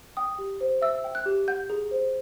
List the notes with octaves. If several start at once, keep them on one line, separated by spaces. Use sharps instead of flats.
G5 D#6
G4
C5
E5 E6
G5
F#6
G4
F#5 G6
G#4
C5